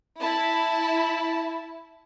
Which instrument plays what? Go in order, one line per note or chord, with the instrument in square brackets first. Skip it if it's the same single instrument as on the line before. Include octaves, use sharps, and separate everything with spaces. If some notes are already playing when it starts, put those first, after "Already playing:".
[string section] E4 [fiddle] A5